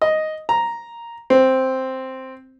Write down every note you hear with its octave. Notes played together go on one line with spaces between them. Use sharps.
D#5
A#5
C4